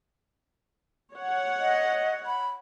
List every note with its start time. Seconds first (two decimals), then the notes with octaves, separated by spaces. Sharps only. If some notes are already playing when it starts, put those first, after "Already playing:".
1.13 C#5 F#5
1.60 D#5
2.26 B5